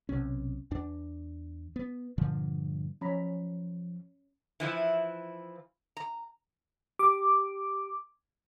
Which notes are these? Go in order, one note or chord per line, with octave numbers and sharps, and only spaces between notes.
B1 C3 C#4
E2 D4
B3
G2 A#2 D3 F3
F3 C#4 A#5 B5
E3 F3 E4
A#5
G4 D6